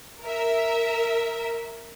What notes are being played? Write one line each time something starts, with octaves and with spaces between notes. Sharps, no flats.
A#4 E5